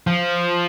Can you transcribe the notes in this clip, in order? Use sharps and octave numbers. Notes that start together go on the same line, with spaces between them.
F3